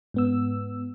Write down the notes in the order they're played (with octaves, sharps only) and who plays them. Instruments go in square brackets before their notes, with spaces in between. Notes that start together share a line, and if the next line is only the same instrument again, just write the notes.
[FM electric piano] G#2 B3 E6